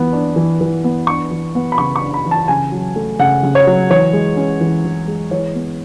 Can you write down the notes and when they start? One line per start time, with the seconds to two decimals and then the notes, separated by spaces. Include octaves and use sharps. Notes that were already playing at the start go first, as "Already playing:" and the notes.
Already playing: E3 B3
0.13 D4
0.36 E3
0.61 E3
0.84 B3
1.07 D4 C#6
1.31 E3
1.55 B3
1.72 B5
1.78 C#3 C#6
1.96 C#6
2.02 D4
2.14 B5
2.26 E3
2.31 A5
2.48 C#3 G#5
2.72 F#3
2.96 A3
3.19 C#3 F#5
3.43 C#3
3.55 C#5
3.67 F#3
3.90 E3 C#5
4.13 G#3
4.37 C#4
4.61 E3
4.85 E3
5.08 G#3
5.31 E3 C#5
5.55 B3